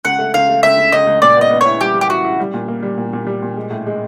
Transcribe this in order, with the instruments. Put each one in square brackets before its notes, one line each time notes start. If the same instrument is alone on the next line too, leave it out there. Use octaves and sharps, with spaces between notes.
[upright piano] C#2 [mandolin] F#5
[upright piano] A3
[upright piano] C#2 [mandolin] F5
[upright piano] A3
[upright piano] C#2 [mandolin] E5
[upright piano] C#3
[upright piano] C#2 [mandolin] D#5
[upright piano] C#2
[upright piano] A#2 [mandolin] D5
[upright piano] B3 [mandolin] D#5
[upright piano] B3
[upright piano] E4 [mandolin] C#5
[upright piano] G3 [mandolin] G4
[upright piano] G3
[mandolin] G4
[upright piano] E4 [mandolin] F#4
[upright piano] E4
G3
A#2
A#3
G3
A#2
A#2
G3
A#2
G#3
A2
G#3